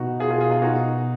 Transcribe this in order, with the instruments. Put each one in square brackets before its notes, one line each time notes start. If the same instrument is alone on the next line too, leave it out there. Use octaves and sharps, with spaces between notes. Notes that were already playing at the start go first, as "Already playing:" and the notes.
Already playing: [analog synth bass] B2 [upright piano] D#4 F#4
[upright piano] F4 G#4
F4 G#4
F4 G#4
F4 G#4
D#4 F#4